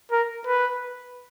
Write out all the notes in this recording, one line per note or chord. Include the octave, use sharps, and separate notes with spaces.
A#4
B4